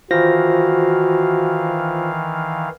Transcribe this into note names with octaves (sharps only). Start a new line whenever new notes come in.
D#3 E3 F4 F#4 C5 F5 A#6